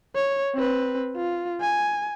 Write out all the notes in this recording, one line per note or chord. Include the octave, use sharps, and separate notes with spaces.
C#5
C4 B4
F4
G#5